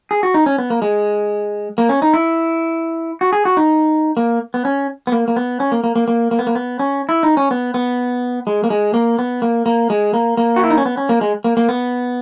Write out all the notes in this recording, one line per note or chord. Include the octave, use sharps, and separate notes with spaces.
G#4
F#4
D#4
C#4
B3
A#3
G#3
A#3
C#4
D#4
E4
F#4
G#4
F#4
D#4
A#3
B3
C#4
B3
A#3
A#3
B3
C#4
A#3
A#3
A#3
A#3
A#3
B3
A#3
B3
C#4
E4
D#4
C#4
B3
B3
G#3
A#3
G#3
A#3
B3
A#3
A#3
G#3
A#3
A#3
F#4
E4
D#4
C#4
B3
C#4
A#3
G#3
A#3
A#3
B3